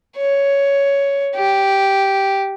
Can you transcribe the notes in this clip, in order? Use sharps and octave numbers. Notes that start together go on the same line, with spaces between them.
C#5
G4